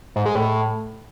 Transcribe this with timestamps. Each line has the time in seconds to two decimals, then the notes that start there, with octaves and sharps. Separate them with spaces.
0.16 G#2
0.26 G#3
0.35 A2